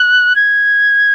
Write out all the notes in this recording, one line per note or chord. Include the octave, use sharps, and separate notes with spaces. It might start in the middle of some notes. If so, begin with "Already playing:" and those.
Already playing: F#6
G#6